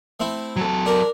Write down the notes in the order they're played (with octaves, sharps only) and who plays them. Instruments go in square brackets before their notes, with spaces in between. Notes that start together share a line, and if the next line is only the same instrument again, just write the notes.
[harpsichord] A3 C4 E4
[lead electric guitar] F#3 A4
[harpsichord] D4 A#4